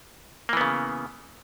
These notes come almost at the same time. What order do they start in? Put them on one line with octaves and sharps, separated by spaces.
A#3 E3 B3 C#3